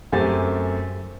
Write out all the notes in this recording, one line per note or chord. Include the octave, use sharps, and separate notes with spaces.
F#2 A3 C4 G4 G#5 A6